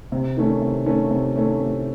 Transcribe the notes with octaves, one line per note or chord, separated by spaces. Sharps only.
C3
D#3 A3 C#4
C3
D#3 A3 C#4
C3
D#3 A3 C#4
C3